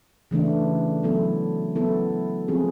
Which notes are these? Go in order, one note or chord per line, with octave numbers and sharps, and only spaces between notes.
C#3 E3 A3 D4
F#3 B3 E4 A4
F#3 B3 E4 A4
F3 G#3 C4 F4 G#4